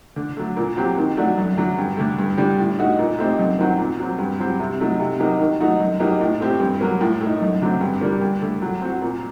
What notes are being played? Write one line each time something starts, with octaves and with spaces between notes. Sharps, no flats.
D3
F#3 A3
A#2
F#3 C4 G4
D#3
F#3 A3 D4 F#4
F#2
D3 F#3
G2
D3 A3
G2
D3 G3 D4
A2
A3 D#4 F#4
A#2
A3 C4 D#4 G4
F#2
D#3 F#3 C4 F#4
A#2
F#3 C4
G2
F#3 C4 G4
C3
F#3 A3 D#4
C3
F#3 A#3 D#4 G4
D#3
F#3 A3 D#4 F#4
F#2
F#3 A#3 D#4 G4
A2
A3 C4 G4
G2
F#3 A#3
A2
A3
D#4
F#2
D3 F#3 A3 C4
G2
D3 G3 A#3
G2
D3 A3
F#3
C4 F#4
A#2